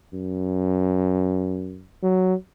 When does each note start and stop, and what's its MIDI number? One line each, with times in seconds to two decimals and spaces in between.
0.14 1.86 42
2.03 2.34 54